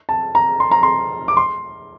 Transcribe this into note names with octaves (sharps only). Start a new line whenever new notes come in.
A5
A#5
C6
A#5
C6
D6
C6